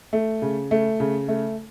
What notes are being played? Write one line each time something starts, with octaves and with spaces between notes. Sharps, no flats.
A3
C#3
A3
C#3
A3